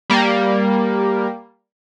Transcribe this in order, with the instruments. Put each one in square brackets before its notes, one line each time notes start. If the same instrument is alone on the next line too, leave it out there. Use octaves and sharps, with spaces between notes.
[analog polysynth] G3 A#3